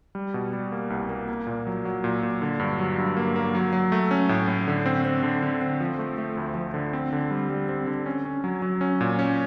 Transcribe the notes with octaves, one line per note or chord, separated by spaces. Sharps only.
G3
B2
G3
A#3
C2
A#3
A#3
A#2
F#3
F#3
A#2
A#2
D3
G2
F#3
G2
A#3
A#3
F#3
F#3
A3
C#4
A2
A2
D3
C4
C4
D3
D3
C4
F3
A3
A3
D2
F3
D3
C4
D3
G3
G3
C4
D3
C#4
C#4
F#3
F#3
C#4
A#2
C#4